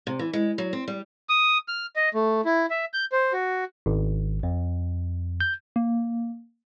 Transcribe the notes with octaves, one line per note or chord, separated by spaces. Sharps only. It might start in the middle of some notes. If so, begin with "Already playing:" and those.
C3
E3
G#3
F#3
C4
G3
D#6
F6
D#5
A3
E4
E5
G6
C5
F#4
G#1
F2
G6
A#3